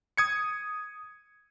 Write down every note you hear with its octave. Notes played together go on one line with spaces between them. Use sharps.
D#6 G#6 C#7